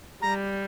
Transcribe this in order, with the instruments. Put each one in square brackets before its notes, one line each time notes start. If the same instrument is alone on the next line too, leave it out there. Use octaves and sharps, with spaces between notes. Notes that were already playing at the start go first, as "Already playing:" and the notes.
[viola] G3 [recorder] A#5